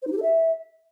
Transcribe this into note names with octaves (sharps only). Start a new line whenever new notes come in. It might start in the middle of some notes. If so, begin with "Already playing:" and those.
C5
D#4
G4
A4
E5